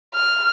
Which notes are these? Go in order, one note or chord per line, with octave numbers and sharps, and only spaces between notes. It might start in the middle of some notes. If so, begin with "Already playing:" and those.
F6